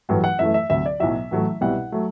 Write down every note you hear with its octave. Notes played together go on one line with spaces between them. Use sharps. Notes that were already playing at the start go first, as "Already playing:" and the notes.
A1 G2 F#3 A3
F#5
F#2 E3 A3 E5
E5
D2 C3 F#3 E5
D5
B1 A2 F#3 E5
A1 A2 F#3 A3
C2 B2 G3 F#5
F#3 A3